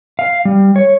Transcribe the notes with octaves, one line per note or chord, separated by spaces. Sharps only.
F5
G3
C#5